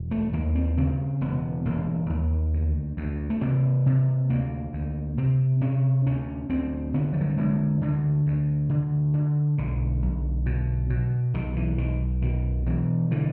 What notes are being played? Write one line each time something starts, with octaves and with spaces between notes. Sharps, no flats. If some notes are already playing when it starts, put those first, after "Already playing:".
Already playing: E1
A3
D#2 A#3
C4
C#3 C4
E1 B3
E1 A#3
D#2
D2
D2
A3
C3 A#3
C3
D2 A#3
D2
C3 C4
C3 C#4
D2 C#4
D2 C4
D3 B3
F3
F#3
G3
D3 G#3
D2 D3
D2
D3
D3
B1 D3
B1
B2
B2
B1 D#3
E3
B1 D#3
B2 D#3
B2 E3
D3 E3